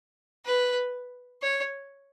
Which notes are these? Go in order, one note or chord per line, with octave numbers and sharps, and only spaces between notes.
B4
C#5